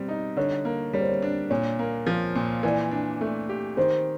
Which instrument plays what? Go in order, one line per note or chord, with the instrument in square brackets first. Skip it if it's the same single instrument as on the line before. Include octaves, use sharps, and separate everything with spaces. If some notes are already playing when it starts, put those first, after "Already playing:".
Already playing: [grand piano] B2 G3 C4
D#4
[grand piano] D3 [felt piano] C#5
[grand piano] A#3
[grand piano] G3 [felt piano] C#5
[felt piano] C5
C#5
[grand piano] D4
[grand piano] A#2 [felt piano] C#5
[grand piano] A#3
F3
A#2
[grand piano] E3 [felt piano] D5
[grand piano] D4
A3
G4
[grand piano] D#3 [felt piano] C5